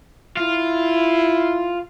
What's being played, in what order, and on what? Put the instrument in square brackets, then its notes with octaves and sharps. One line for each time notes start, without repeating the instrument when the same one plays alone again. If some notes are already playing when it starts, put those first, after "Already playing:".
[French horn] E4 [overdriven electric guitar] F4